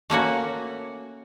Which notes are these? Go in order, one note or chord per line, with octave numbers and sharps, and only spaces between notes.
A3 A#3 C#4 F#4